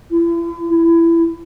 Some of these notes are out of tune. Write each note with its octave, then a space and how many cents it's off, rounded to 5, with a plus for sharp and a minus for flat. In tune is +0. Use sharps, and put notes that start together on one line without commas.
E4 +40
E4 +20